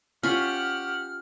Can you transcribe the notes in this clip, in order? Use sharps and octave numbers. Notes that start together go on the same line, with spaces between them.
C#4 F4 G4 F#5 F6